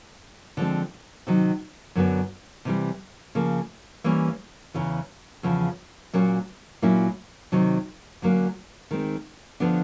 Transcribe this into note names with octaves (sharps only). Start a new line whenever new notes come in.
D3 F3 G#3 C4
C3 D#3 F#3
F#2 D3 F#3 B3
C3 E3 G3
C#3 F3 A#3
E3 G3 A#3 C#4
E2 C#3 E3
E2 C#3 F3
A#2 F#3 A#3 C#4
A#2 F#3 A#3 C#4 E4
C3 D#3 F#3
D3 F#3 A#3 C#4
D#3 G#3 C4
D3 F3 G#3 B3 D4